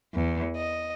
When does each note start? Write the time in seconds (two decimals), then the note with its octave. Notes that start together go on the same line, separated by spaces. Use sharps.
0.13 E2
0.55 D#5